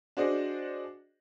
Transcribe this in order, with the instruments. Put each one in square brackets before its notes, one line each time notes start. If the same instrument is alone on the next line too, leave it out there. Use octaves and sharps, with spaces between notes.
[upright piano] D4 F#4 G#4 C5 D5 D#5